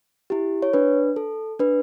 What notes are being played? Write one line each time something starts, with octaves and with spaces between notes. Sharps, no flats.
E4 G4
C#5
D4 B4
A4
D4 B4